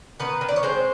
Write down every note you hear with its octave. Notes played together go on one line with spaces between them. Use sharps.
D#3 B3 B4
D#3
D5
C#5
G#3 C4 C5